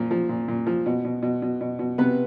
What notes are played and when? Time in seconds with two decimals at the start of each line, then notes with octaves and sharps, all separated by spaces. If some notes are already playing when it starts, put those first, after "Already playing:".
Already playing: A#2 F3
0.11 F3
0.29 A#2
0.48 A#2
0.67 F3
0.86 B2
1.05 B2
1.23 B2
1.42 B2
1.61 B2
1.79 B2
1.98 C3 B3 B4